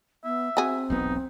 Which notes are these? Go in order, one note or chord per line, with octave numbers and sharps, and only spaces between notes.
B3 E5
C4 F#4 G#4
E1 B1 B3 D#4